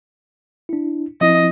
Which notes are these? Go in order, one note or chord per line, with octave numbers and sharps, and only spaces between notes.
D4 E4
F3 C4 E4 D#5